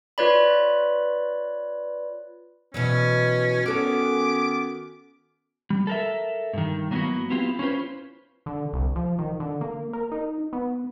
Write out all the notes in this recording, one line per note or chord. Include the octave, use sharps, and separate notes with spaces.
F4 B4 C#5 D5 B5
B2 E3 F#3 C#4
D#3 B3 C#4 F#4 A4 C#5 D6
G3
A4 A#4 E5
G2 D#3
F#3 A#3 B3 C#4 E4 F#4
B3 C4 E4 F4 G4
C#4 E4 F4 B4 C5
D3
C2
F3
D#3
D3
A#3
A#4
D#4
B3